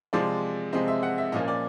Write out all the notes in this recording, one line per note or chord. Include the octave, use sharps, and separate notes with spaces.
C3 F3 G#3 C4 D5
C3 F3 G#3 C4 D#5
E5
F#5
E5
A#2 F3 A#3 C#4 D#5
D5